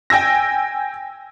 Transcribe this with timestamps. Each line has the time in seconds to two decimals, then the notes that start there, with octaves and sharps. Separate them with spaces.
0.10 G5 G#5 E6 A#6